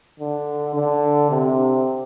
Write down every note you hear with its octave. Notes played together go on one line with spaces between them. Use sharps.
D3
D3
C3